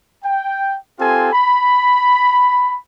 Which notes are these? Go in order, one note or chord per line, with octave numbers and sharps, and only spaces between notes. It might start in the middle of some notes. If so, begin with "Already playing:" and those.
G5
C4 F4 G4 A4 G#5
B5